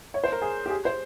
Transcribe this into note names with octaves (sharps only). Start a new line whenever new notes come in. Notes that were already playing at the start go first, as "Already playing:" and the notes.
C#5
C5
A#4
G#4
G4
G#4
C5